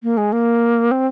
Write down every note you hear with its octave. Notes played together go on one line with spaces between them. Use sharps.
A#3
G#3
A#3
C4